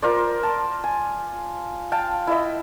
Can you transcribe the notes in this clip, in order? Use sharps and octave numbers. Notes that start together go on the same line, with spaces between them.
F4 A#4 C5 D5
A5
G#5
F5 G5 A5
E4 D#5 E5